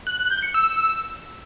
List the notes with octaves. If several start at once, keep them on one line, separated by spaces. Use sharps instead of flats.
F#6
F#6
G6
C#7
E6